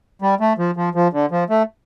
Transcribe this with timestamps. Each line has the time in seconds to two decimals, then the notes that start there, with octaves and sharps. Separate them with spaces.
0.22 G3
0.40 A3
0.58 F3
0.77 F3
0.95 F3
1.13 D3
1.31 F3
1.50 A3